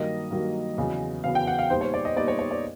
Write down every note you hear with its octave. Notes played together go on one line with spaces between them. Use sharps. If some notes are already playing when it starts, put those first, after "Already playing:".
Already playing: G2 D#3 F#3 A#3 D#5
G2 D#3 F#3 A#3
E2 C#3 F#3 B3
E2 C#3 F#3 B3 F5
G5
F#5
F5
A#2 G3 B3 D#4 C5
C#5
D5
D#5
A#2 G3 B3 D#4 D5
C#5
C#5
D5